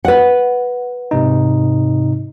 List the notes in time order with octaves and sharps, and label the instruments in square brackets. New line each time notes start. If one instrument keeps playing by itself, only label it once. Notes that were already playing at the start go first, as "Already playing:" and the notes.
[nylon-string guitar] B4 F#5
[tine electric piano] G#2 C3 D#4